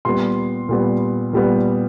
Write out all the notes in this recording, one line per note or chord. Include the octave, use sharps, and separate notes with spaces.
A#2 G3 B3 C6
A#2 G3 B3
A#2 G3 B3